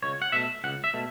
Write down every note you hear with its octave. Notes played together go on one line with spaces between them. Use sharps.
C#2 C#5
F#5
B2 A3 E5
C#2 F#5
E5
B2 A3